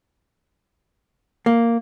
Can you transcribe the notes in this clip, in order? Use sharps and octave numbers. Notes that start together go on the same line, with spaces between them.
A#3